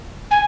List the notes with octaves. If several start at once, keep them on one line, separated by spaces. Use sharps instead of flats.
G#5